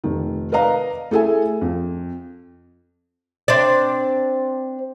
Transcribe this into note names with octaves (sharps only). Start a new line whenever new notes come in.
F1 D#3
A#4 B4 D5 D#5 F5 A#5
A3 E4 G#4 A4 E5 G#5
F2
C4 D4 D5